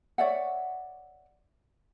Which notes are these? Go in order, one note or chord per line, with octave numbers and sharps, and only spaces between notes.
C#5 D5 E5 F#5